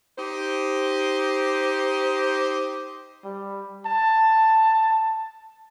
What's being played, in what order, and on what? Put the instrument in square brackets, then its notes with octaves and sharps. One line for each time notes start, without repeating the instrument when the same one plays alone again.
[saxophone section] D#4 G4 C5
[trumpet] G3
A5